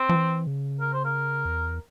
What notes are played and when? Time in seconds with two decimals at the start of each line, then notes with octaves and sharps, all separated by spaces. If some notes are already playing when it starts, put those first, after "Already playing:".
Already playing: C4
0.09 F3
0.15 E3
0.47 C#3
0.80 A#4
0.93 C5
1.05 A#4
1.45 E2